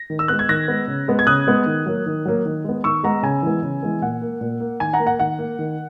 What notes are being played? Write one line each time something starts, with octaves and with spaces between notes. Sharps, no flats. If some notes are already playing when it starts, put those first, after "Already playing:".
Already playing: A#6
D#3
E6
G#3 B3 F#6
G#6
D#3 F#6 A#6
G#3 B3
C#3
G#3 B3
G#6
C#3 D#6 F#6
G#3 B3
D#3
F#3 A#3
D#3
F#3 A#3
D#3
G#3 B3
D#3 C#6 E6
G#3 B3 F#5 A#5
C#3 G#5
E3 G#3 B3
C#3
E3 G#3 B3
A#2 F#5
A#3
A#2
A#3
D#3 G#5
F#5 A#5
A#3
F#5
D#3 F#5
A#3
D#3